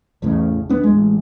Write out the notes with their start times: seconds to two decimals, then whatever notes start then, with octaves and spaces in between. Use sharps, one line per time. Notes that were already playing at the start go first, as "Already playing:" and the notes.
0.22 A1 E2 A2 C#3
0.69 D#2 B3 D4
0.83 A1 G#3